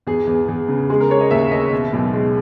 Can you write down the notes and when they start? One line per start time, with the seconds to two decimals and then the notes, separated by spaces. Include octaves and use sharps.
0.07 E2 G#4
0.27 E2
0.48 E2
0.68 C#3
0.90 G#3 G#4
1.00 A#4
1.10 G#3 C#5
1.21 D#5
1.31 D#2 E5
1.51 D#2 D#5
1.73 B2
1.93 B1
2.13 G#3